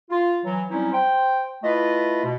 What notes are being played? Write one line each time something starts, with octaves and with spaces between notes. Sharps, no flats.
F4
E3 F#3
F#3 G3 C4 C#4 D#4 E4
C5 G5
A3 E4 F4 B4 D#5
B2